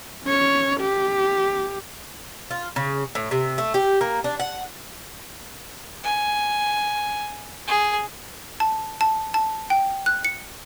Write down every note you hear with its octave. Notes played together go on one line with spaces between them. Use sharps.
C#4 C#5
G4
F4
C#3
A2
C3
A3
G4
A#3
D4
F#5
G#5
G#4
A5
A5
A5
G5
F#6
C#7